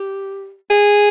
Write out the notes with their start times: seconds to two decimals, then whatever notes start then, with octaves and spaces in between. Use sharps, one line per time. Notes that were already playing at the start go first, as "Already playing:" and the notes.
Already playing: G4
0.70 G#4